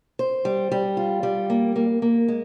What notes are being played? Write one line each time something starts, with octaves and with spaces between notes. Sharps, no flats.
C5
G3
G3
F4
G3
A#3
A#3
A#3
G#3